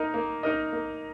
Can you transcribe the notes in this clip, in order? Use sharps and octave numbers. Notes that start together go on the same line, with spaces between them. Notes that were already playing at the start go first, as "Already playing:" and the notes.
Already playing: A#3 D#4 A#4 D#5
A#3
D#4 A#4 D#5
A#3